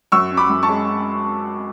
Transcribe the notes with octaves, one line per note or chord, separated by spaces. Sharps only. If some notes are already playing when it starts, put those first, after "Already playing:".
F#2 C#6 E6
C#4
B5 D6
F#2
A5 C#6
G#3